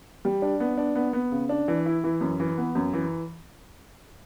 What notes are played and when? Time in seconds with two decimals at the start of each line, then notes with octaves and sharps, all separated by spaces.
0.25 G3
0.42 D4
0.60 B3
0.78 D4
0.95 B3
1.13 B3
1.32 C#3
1.49 D4
1.68 E3
1.86 E4
2.04 E3
2.21 F#2
2.40 E3
2.58 B3
2.75 F#2
2.93 E3